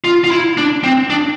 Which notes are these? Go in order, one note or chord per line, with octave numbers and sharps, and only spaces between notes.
F4
F4
E4
D4
C4
D4